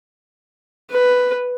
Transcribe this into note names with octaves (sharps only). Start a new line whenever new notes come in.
B4